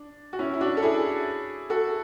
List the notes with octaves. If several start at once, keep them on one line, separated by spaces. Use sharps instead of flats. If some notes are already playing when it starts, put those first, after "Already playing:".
Already playing: D4
F#4
C#4 E4
E4
D4 F#4
A4
E4 G#4
F#4 A4